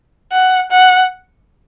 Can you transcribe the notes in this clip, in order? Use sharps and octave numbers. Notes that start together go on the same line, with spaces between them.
F#5
F#5